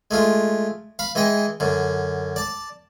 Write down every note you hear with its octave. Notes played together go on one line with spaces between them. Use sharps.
G#3 A3 F4
F5 B5
E3 G#3 D#5 G5
F#2 D3
D5 A5